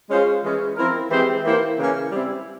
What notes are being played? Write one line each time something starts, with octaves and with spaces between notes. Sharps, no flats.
G#3 C#4 F4 G#4 C5
E3 G#3 C#4
F3 C4 E4 A#4
E3 G#3 C4 G4 C5
E3 A#3 E4 G4 C5
C#3 E3 A#3 C#4
G3 C4 E4